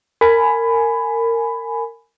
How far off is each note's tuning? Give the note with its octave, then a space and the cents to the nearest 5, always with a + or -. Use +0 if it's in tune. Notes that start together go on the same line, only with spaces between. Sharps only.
A#4 -20 G#5 +10 B5 +15